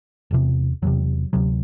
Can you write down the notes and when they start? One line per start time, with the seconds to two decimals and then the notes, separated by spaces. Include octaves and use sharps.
0.31 E1 E2 C3
0.82 E1 E2 C3 F#3
1.33 D2 C3 F#3